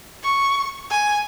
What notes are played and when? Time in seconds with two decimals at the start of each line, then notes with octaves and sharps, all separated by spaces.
0.23 C#6
0.90 G#5